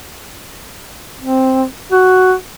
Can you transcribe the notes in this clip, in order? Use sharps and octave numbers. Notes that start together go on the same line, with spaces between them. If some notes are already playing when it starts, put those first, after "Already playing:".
C4
F#4